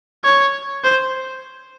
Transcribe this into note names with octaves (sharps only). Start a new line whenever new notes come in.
C#5
C5